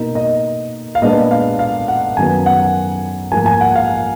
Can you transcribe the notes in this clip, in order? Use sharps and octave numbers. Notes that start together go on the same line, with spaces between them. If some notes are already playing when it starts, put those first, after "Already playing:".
Already playing: B2 A#3 D#4
D#5
F5
A#2 G#3 B3 D4 D#5
F5
F5
F#5
F#2 D#3 F#3 B3 G#5
F#5
G#2 F3 A#3 G#5
G#5
F#5
F5